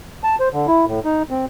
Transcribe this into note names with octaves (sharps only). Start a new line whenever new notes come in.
A5
C5
D3
E4
A2
D#4
C4